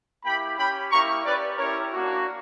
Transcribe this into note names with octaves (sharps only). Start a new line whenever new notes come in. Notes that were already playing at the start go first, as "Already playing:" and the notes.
A#3 E4 G4 G5 B5
C#4 G4 G5 B5
A#3 E4 G4 A#5 C#6
C#4 G4 B4 D5
C#4 E4 G4 A#4 C#5
A#3 D4 F#4